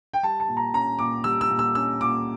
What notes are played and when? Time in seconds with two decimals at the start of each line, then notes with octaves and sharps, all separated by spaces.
0.13 G5
0.23 G3 A5
0.40 A5
0.49 A#2
0.57 A#5
0.73 C#4 A#5
0.99 A#2 D6
1.24 G3 E6
1.41 E6
1.50 A#2
1.59 E6
1.75 C#4 E6
2.01 A#2 D6